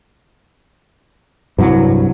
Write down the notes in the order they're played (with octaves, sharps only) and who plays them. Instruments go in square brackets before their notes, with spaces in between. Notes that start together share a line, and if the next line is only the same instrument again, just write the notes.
[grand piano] C2 [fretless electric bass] G2 F#3